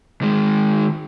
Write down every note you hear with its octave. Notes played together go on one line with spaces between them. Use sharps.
D#3 G#3